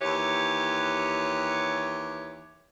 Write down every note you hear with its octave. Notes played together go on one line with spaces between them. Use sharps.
D#2 E3 G4 C#5